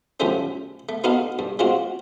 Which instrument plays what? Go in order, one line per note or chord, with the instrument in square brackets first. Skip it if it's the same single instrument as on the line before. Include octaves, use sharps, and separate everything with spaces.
[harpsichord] F#2 D3 F3 G3 A3 C#4
A3
B3 D#4 F#4 A4 B4 F5
G2
G#3 A#3 C4 F4 F#4